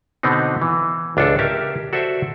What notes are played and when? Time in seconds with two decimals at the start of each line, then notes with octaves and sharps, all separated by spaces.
0.23 B2 D3 B3 C4 D#4
0.62 E3
1.17 C#2 D4 F4 A4
1.39 C#4 G4 A#4 E5 A5
1.93 F#4 A4 C5 D5 E5